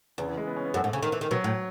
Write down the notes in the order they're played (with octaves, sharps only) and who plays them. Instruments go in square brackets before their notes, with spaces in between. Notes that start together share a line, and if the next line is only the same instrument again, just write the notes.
[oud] E2 [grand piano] C#3
[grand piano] E3
G#3
B3
C#4
B3
[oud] F#2 [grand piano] A3
[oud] G#2
C#3
D#3
E3
D#3
[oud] B2 [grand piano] F#3
[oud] A2